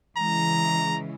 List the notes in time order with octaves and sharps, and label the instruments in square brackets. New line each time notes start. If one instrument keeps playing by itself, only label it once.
[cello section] C#3 E3 G#3 [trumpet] A#5